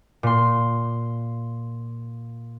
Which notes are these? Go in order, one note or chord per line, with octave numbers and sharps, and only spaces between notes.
A#2 C6